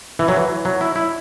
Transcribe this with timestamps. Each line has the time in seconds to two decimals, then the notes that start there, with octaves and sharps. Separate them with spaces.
0.19 E3
0.28 F#3
0.36 E3
0.65 F#3
0.81 E4
0.96 E4